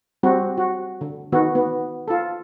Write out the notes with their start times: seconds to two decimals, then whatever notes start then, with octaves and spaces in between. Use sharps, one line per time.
0.23 G3 C4 F#4
0.57 F#4
1.01 D3
1.32 D#3 B3 F#4
1.55 B3
2.08 F4 A4